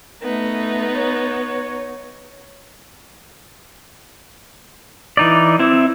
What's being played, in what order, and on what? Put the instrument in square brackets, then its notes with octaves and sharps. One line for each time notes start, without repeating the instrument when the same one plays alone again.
[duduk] A3 [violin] B3 D#4
[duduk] C#5
[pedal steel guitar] E3 D#4 D5
C4 E4